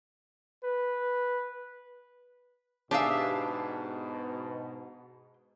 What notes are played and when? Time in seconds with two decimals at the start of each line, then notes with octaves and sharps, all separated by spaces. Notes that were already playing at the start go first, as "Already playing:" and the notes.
0.63 B4
2.91 G#2 B2 D4 G4 G#4 E5 F5